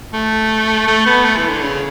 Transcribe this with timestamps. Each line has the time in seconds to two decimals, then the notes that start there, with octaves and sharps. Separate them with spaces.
0.13 A3
0.88 A3
1.06 B3
1.25 A3
1.37 E3
1.49 D3
1.63 C#3